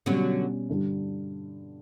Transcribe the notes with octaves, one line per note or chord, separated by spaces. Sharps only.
B2 D3 F#3 G3 C#4
G2 D3 G3